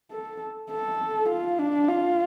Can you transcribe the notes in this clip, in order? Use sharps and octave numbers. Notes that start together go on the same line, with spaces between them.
A4
A4
F4
D4
F4